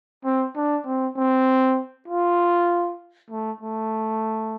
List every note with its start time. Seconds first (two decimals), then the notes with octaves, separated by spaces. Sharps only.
0.25 C4
0.56 D4
0.86 C4
1.16 C4
2.08 F4
3.30 A3
3.61 A3